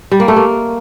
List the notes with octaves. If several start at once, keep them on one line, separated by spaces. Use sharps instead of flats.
G3
A#3
A3
A#3